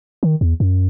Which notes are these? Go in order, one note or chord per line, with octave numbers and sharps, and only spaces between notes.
D#3
E2
F#2